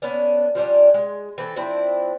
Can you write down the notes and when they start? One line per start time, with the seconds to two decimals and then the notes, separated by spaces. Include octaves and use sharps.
0.02 B3 C#4 D4
0.55 F3 G3 C#4 D4
0.94 G#3
1.38 E3 C4 A4
1.56 F3 C4 D4 E4